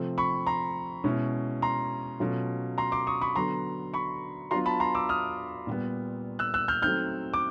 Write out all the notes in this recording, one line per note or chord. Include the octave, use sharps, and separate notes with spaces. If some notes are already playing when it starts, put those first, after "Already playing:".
Already playing: C3 F3 A3 C4
B5 C#6
A#5 C6
B2 G#3 C#4 E4
A#5 C6
B2 F#3 A3 C#4 F4
A#5 C6
C6 D6
C#6 D#6
B5 C#6
D3 F#3 B3 A#5 C6
B5 C#6
F#3 B3 D4 F4 A#5 C6
A5 B5
A#5 C6
D6 E6
D#6 F6
A#2 G3 B3
E6 F#6
E6 F#6
F6 G6
F#3 A3 C4 D#4 F6 G6
D6